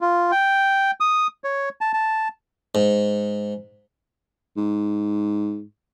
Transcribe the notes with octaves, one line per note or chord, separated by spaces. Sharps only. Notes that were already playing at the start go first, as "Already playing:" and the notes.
F4
G5
D#6
C#5
A5
A5
G#2
G#2